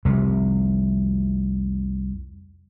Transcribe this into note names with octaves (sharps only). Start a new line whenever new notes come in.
C2 F2 C3